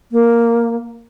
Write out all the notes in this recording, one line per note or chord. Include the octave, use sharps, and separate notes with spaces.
A#3